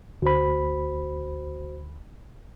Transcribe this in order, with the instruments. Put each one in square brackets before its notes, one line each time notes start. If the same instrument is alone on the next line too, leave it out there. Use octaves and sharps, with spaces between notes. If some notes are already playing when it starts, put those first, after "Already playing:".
[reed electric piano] D2 B5 [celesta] F#4 C5